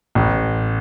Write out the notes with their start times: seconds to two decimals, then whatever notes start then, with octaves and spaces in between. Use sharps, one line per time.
0.15 A1